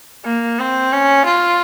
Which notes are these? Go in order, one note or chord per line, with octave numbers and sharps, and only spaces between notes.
A#3
C4
C#4
F4